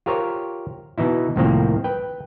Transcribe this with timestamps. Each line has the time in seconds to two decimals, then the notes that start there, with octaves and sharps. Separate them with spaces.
0.06 F4 G4 A#4 C5 C#5
0.98 B2 E3 D#4 E4
1.36 C2 A2 D#3 F3 A#3 C4
1.84 B4 G5